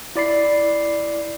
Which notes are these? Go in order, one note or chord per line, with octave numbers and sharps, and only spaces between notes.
E4 D5 B5 C7